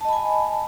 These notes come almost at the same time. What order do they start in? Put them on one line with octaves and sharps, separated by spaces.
A5 D#5 B5 G#5